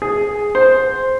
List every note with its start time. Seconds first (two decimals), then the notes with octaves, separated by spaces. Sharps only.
0.02 G#4
0.55 C5